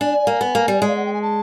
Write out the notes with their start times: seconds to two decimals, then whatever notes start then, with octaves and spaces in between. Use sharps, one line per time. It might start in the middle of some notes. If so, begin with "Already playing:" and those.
0.01 D4 G#5
0.27 A#3
0.41 B3
0.55 A#3
0.68 G3
0.82 G#3
0.88 F5
0.96 F#5
1.06 G5
1.13 G#5
1.22 A5